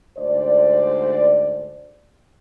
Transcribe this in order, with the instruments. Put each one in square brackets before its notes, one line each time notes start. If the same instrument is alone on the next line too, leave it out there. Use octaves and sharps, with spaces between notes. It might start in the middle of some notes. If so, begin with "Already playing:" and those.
[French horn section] D2 G#2 A4 C5 D5